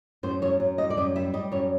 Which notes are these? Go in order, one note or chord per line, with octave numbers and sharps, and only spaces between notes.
F#2 C5
F#2 C#5
F#2
G3 D#5
D5
F#2 D#5
G3 E5
G3 D#5
F#2 C#5